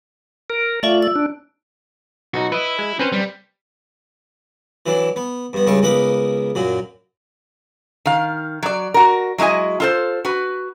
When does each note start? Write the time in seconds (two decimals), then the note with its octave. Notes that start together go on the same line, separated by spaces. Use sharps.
0.50 A#4
0.83 A3 F4 D5 E5 F5
1.02 E6
1.15 D4
2.34 B1 D#4 F#4
2.52 E4 B4 D#5
2.79 G#3
2.99 C4 C#4 B4 C5
3.12 G3
4.86 E3 F#3 D4
5.16 B3
5.53 G2 B3
5.66 C#2 G2 C#3 E5 C#6
5.82 C#2 A#3 B3 B4 B5 D#6
6.55 F#2 A#2 F#3
8.06 D#3 F5
8.63 F#3 D5
8.94 F#4 A#4
9.38 F#3 G#3 E4 D#5 G#5
9.80 F4 A4 C5
10.25 F#4 B4